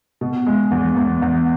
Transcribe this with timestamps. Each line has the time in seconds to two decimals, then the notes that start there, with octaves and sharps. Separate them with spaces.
0.21 B2
0.47 G#3
0.71 E2
0.96 E2
1.22 E2